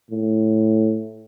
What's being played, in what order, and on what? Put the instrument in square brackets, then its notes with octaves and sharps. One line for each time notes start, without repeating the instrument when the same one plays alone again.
[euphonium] A2